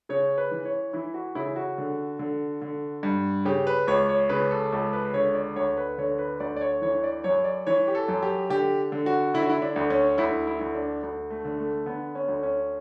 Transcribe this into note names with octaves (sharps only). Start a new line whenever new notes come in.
C#3 C#5
B4
E3
C#5
E3 E4
F#4
C#3 E4
F#4
D3
D3
D3
G2
C#3 G4
B4
C#2 C#5
C#5
C#3 B4
A4
C#2 A4
B4
D3 C#5
D5
D2 C#5
B4
D3 C#5
B4
D2 D5
D5
C#5
E3 C#5
D5
F#2 C#5
D5
E3 C#5
G4
A4
F#2
G4
D3 G4
D3
F#4
D3 E4
F#4
E4
D4
D2
C#4
D2 E4
E4
D2
D4
D2
A3
D3
A3
D3 B3
C#4
D2
C#4